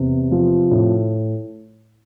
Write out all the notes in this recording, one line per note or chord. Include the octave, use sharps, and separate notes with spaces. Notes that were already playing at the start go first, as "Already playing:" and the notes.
Already playing: E2 C3
F3
A2